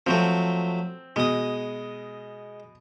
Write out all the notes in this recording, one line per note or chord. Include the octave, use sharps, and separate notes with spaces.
F3 F#3 A3 C4
B2 G#3 D#6